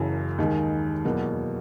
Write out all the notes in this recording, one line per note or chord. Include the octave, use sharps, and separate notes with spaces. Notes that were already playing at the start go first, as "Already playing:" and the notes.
Already playing: F#1 F#2 C#3 E3
D#2 D#3 G#3
E2 B2 F#3 A#3